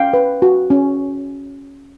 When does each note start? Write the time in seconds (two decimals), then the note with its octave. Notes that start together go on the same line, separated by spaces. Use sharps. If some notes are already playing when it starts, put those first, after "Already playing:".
Already playing: C#4 F5 G5
0.13 B4
0.42 F#4
0.70 C#4